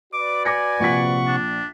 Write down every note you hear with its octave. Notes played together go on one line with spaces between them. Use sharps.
F#4 B4 D5 D6
G#5 D6 A#6 C#7
A#1 C3 F4 F#5 C#6 B6
D4